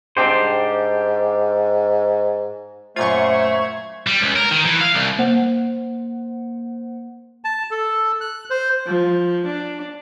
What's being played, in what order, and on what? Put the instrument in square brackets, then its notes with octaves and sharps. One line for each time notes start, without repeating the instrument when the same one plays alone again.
[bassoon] G#2 [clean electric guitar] D4 G4 C5
[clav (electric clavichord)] F#2 A#2 F4 [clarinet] A3 [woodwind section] C5 [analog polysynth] C#6 G#6
[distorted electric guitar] G3
C#2
A#4
D#3
E3
F5
C2
[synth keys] A#3 C5 F#5
[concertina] A5
A4
F#6
C5
[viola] F3
D4